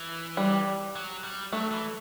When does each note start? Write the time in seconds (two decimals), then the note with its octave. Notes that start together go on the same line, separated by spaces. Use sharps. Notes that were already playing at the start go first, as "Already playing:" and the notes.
Already playing: E3
0.37 G3
0.95 F#3
1.24 G3
1.52 F#3 A3
1.71 E3